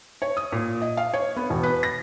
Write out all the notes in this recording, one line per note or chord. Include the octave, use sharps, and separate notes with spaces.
C#5
D#6
A#2
D#5
F5
C#5
B3
E1
B4
A#6